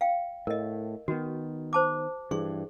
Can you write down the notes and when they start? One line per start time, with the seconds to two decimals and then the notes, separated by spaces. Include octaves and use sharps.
0.01 F5 G5
0.47 A2 A#4 D#5
1.08 D#3 B3 F#4
1.73 C5 A5 D6
2.31 G2 E3 G#4 C#6